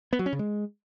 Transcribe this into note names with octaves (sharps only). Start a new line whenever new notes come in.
B3
F#3
C#4
C#3
G#3